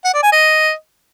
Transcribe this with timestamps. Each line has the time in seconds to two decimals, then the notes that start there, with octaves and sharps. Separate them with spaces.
0.05 F#5
0.14 D5
0.23 G#5
0.32 D#5